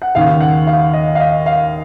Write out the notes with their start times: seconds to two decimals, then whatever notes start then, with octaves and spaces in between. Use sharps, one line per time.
0.02 F#5
0.15 D#2 C#3 F5
0.41 F#5
0.67 F5
0.93 D#5
1.15 F5
1.20 D#5
1.46 F5